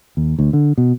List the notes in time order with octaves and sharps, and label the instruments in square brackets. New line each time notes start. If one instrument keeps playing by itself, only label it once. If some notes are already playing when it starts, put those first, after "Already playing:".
[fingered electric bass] D#2
D2
D3
B2